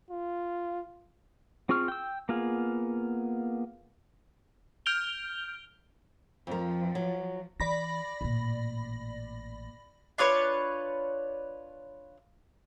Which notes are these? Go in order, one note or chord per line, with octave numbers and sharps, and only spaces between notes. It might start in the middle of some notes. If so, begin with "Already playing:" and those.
F4
C4 F4 G#4 C#6 F6
G5 E6
A#3 B3 F4 G#4
F6 G6 D7 F7 G7
F2 F3 A#4
F#3
E3 D5 B5 A#6
A1 A#2
D4 F4 B4 C#5